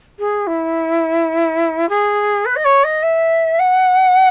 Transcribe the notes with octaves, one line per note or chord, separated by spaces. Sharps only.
G#4
E4
G#4
B4
D#5
C#5
D#5
E5
F#5